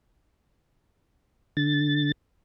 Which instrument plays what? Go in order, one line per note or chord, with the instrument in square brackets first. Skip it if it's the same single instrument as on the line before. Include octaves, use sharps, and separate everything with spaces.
[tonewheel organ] D3 A6